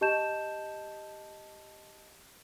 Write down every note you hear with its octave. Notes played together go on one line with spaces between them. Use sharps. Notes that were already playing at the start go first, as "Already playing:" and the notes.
G4 D#5 A5 G6 E7